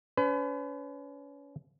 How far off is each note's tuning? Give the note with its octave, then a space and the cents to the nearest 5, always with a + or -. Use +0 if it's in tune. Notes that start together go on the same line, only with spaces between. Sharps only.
C#4 +35 B4 +40